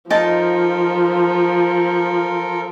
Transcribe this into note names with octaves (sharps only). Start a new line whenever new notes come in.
F3 D#4 F4 A4 A#4 A5